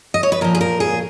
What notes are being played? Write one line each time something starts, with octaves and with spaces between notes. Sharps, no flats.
D#5
C#5
B4
A#2 F3 A#4
G#4
A#4
G#4